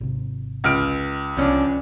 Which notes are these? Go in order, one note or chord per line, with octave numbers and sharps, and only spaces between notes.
G#1 C3
C#2 F6 D7
C2 F3 C#4 D4 F4